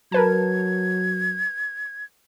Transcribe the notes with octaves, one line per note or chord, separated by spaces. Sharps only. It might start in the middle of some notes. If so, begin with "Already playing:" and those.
F#3 A#4 B4 A5 G#6